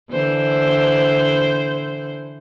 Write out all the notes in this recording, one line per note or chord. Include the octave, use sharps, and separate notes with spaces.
D3 E3 C5